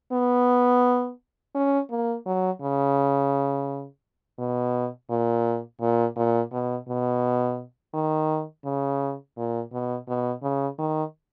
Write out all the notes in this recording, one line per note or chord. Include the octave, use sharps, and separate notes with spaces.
B3
C#4
A#3
F#3
C#3
B2
A#2
A#2
A#2
B2
B2
D#3
C#3
A#2
B2
B2
C#3
D#3